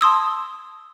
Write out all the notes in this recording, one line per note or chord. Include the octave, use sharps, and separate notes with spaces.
A5 C6 D#6 E6